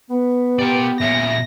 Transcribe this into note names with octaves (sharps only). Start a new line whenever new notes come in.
B3 B4
G4 A#4 D5
A#2 C#4 E5 A#6